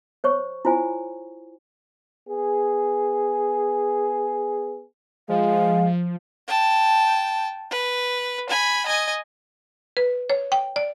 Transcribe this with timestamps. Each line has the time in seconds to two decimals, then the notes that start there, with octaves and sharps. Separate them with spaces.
0.24 C5 C#5 C#6
0.65 E4 F4 C5 G#5
2.28 B3 G#4
5.29 F3 G#3 F5
6.48 G5 A5
7.71 B4
8.49 G#5 B5
8.86 D#5 G#5
9.97 B4
10.30 C#5
10.52 G5
10.76 D5